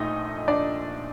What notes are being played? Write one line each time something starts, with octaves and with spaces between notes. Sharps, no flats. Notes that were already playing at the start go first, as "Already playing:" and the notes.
Already playing: A#1 A#2 A3 D#4 D#5
D4 D5